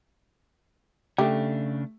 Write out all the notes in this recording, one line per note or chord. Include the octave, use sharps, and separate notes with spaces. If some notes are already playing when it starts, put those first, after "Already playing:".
C#3 A3 D4 G4